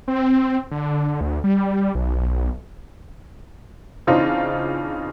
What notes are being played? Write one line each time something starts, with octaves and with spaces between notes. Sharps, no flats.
C4
D3
D2
G3
B1
C#3 E3 C4 D4 D#4 F4